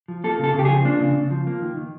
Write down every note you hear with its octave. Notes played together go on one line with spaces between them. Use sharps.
F3
A#3 A4
C#3 A4
C#3 G4
G#4
F3
A#3 D4
C#3
C#3
F3
A#3
D#3
D#3